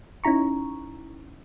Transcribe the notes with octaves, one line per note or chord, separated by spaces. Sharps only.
C#4 D#4 E4 A#5 C#6